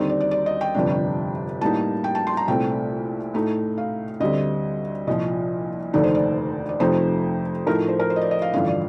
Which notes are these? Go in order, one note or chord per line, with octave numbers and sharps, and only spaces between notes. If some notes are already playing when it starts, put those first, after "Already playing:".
Already playing: D#2 D3 G3 C4 D#4
D5
D5
D5
D#5
G5
G1 F2 C3 G3 D4
A2 G3 A#3 D#4 A5
G5
A5
C6
A#5
C2 A#2 A3 C4 G5
A2 A3 D#4
F5
D2 D3 G3 C4 D#5
C2 A#2 F3 D#5
F1 D#2 D3 A3 D#4 D5
C5
D5
D5
F2 C3 F3 A3 D#4 C5
A2 F3 A3 D#4 A#4
C5
A#4
C5
D#5
D5
D#5
F5
A1 G2 D3 F3 F5
D5